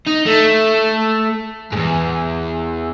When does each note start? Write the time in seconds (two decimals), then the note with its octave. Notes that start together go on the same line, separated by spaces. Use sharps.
0.07 D#4
0.26 A3
1.72 E2 G#2